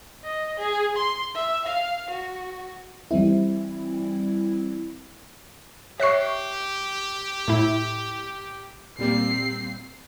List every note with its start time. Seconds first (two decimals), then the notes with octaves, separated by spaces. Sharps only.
0.24 D#5
0.59 G#4
0.96 C6
1.35 E5
1.66 F5
2.10 F#4
3.11 E3 G3 C4 E4
6.00 G4 C#5 E5 C#6 F#6 C7
7.48 A2 E4
8.99 A#2 G3 A#3 C4 C7